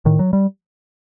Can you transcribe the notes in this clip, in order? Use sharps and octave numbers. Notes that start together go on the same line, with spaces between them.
A2 D#3
F#3
G3